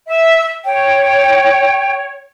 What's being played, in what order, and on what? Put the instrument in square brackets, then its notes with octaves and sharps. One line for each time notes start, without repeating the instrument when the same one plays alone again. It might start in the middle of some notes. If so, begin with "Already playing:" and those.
[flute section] E5
[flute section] C#5 [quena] G5